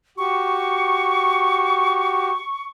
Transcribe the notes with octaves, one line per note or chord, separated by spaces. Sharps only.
F#4 G4 C#6